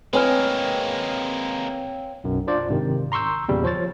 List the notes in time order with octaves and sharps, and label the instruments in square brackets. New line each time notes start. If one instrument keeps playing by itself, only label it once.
[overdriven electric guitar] G#3 A#3 [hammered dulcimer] C4 C#5 G5 [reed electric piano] B4 G#5 F6
[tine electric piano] B1 F#2
D4 F4 C5 D5
G#2 C3 D#3
A#5 C6 C#6 E6 G6
E2 A#2 C#3 G3 B3
F3 C5 C#5 A6